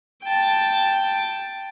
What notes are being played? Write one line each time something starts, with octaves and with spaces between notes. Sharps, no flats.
G5 A5